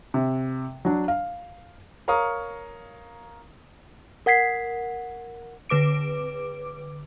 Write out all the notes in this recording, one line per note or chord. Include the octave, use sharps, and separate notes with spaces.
C3
F#3 D4
F5
A#4 C#5 F5 A#5 C#6 D#6
A#4 F#5 G#6 B6 C7
D3 B4 D6 D7